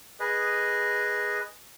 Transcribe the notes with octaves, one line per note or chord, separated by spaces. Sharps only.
G#4 B4 D#5